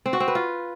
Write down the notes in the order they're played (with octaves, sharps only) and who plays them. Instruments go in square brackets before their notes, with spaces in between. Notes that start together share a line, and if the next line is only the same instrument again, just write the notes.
[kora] C4
F#4
C4
B4
F4